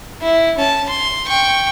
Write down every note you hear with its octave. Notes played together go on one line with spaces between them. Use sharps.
E4
C#4 A5
C6
G5 C#6